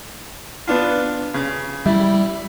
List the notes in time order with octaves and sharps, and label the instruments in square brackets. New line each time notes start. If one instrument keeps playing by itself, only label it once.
[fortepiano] B3 D4 F4
C#3
[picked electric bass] G3 [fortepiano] E4